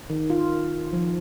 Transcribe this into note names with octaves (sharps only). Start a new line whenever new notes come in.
D#3
F4
F3